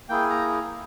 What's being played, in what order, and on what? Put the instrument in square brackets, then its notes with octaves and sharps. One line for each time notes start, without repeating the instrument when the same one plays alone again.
[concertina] A#3 E4 G#4 G5
A#5